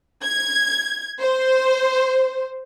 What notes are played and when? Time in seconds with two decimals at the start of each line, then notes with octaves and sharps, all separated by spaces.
0.24 G#6
1.20 C5